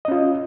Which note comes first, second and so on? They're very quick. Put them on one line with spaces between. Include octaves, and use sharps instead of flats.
D#5 C#4 F4